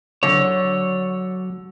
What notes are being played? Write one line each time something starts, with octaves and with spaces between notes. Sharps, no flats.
D3 F#3 C#5